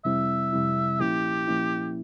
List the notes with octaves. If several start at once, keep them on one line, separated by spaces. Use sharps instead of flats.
F2 C3 G3 C4 E4 E5
F2 C3 G3 C4 E4
A#2 F3 A#3 C#4 E4 G4
A#2 F3 A#3 C#4 E4